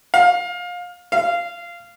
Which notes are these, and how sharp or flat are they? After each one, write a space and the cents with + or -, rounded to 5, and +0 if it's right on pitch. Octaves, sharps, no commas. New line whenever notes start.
F5 +25
F5 -15